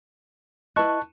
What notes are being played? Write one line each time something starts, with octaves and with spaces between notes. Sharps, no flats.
E4 B4 D#5 A5 C#6 F#6